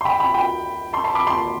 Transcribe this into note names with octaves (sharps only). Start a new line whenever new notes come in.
C6
G5 B5
G5 B5
G5 B5
A5 C6
A5 C6
B5 D6
A5 C6